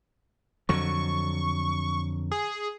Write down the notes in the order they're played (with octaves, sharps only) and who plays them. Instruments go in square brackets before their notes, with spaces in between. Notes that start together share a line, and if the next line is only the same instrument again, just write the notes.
[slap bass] F2 D3 F#3 [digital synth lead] C#6
[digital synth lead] G#4